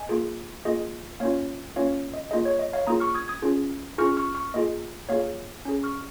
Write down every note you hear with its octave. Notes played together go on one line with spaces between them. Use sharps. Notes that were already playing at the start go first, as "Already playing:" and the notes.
Already playing: D#5 G#5
A#3 F4 G#4
A#3 F4 G#4 D#5
A#3 C#4 F4 C#5 F5
A#3 C#4 F4 C#5 F5
D#5
A#3 F4 G#4 D#5
C#5
D#5
C#5 F5
A#3 F4 G#4 A#5 D#6
C#6 F6
D#6 G#6
D#6 G#6
C#4 F4 G#4
C#4 F4 G#4 C#6 F6
C#6 F6
C#6 F6
A#3 F4 G#4 D#5
A#3 F4 G#4 C#5 F5
C#4 G#4
C#6 F6